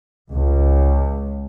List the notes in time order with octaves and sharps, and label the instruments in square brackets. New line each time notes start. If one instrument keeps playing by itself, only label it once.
[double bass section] C#2